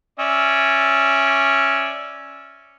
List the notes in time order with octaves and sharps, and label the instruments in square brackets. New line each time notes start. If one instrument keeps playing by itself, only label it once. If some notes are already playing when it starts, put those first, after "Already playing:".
[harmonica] C#4 D5 E5